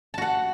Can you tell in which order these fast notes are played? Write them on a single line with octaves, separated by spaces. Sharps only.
A5 F#4 F#5